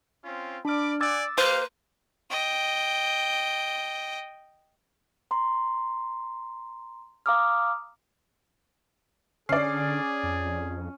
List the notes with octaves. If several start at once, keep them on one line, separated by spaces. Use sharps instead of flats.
C4 C#4 F4
D4 D5 B5 D6 F6
D5 F#5 G#5 D6 E6 A6
A#3 G4 B4 C5 F5
D#5 G5
A#5 C6
F5 A#5 D6 D#6 F6
D3 C#4 G#4 D5 C7
F2